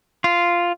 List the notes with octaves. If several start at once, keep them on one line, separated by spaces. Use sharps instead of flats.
F4